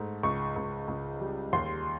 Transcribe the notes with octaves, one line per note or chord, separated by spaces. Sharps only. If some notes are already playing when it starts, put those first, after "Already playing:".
Already playing: G#2 A3
C#2 C#6
C#2
C#2
G3
D#2 C6